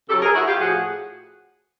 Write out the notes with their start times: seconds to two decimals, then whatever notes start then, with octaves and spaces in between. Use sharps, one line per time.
0.08 C#3 G4 A4
0.13 F#3
0.22 G#4 A#4
0.34 E4 F#4
0.47 F4 G4
0.60 A2 F3 F#4 G#4